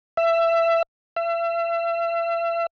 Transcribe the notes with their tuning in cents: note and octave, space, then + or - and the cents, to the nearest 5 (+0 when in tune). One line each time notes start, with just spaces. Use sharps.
E5 +20
E5 +40